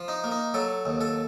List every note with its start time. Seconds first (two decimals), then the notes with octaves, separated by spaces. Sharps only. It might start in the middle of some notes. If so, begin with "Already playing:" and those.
Already playing: F3
0.08 D#4
0.24 A#3
0.31 D#4
0.54 F#3 A4
0.86 D#2
1.01 A4